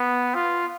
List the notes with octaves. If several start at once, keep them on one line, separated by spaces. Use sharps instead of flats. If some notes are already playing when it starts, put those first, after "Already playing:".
Already playing: B3
F4